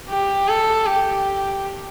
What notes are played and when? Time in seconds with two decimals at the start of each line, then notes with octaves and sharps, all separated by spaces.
0.09 G4
0.48 A4
0.86 G4